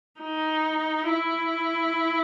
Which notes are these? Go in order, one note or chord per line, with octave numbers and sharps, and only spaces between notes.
D#4
E4